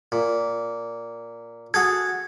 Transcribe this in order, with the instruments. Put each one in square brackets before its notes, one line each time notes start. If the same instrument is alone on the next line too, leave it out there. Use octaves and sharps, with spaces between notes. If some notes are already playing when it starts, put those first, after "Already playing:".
[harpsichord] A#2
[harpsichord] F#4 G#4 A4 [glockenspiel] G#6